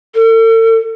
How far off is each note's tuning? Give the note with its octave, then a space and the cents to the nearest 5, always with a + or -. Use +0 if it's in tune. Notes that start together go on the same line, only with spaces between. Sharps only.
A4 +40